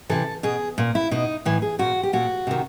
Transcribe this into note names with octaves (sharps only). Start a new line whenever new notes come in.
C3 E3 A4
B2 G#4
A#2
E4
B2 D#4
A2 E3
G#4
A#2 F#4
G4
A#2 F#4
C3 D#3